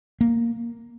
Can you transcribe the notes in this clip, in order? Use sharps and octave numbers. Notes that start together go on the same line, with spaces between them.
A#3